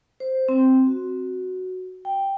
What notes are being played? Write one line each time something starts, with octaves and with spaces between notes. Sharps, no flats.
C5
C4
F#4
G5